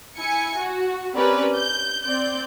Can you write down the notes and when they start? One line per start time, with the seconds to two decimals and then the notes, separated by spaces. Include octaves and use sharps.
0.17 E4 G#5 C#7
0.57 F#4
1.14 C4 C#4 G4 A#4 B4 D5
1.57 G6
2.05 C4 D5 G6